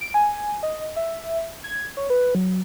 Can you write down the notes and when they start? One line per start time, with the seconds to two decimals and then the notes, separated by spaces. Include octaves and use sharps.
0.01 D7
0.14 G#5
0.63 D#5
0.96 E5
1.64 G#6
1.97 C#5
2.10 B4
2.35 F#3